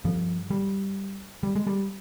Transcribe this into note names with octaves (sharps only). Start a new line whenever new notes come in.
G2 F3
G3
G3
G#3
G3